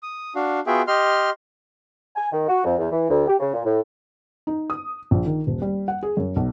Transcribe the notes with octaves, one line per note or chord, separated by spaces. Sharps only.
D#6
D4 F#4 F5
B3 F4 F#4 G#4 E5 G5
G4 D#5 C6 F6
G#5
D#3
F#4
F2
E2
E3
D2
G4
C#3
A#2
A2
D#4
D#6
A#1
D#3
D#1
G3
F#5
G#4
F#2
B1